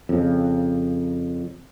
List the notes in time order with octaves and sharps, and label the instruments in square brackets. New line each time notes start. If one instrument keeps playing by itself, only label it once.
[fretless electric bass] F2 C#3